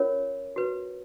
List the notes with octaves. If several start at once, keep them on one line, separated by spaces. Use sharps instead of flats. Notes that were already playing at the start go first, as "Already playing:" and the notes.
Already playing: C#4 F4 A#4 C#5
F#4 B4